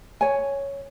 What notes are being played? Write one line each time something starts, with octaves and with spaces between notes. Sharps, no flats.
C#5 G#5